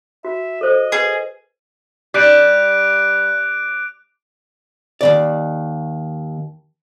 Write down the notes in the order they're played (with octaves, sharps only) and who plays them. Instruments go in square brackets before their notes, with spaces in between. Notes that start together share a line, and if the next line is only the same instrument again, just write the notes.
[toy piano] F#4 [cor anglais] E5
[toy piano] A4 C5 [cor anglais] D#5
[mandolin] G#4 [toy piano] B4
[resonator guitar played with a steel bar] G3 [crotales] D6 F#6 D7
[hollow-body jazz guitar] D#2 B2 D5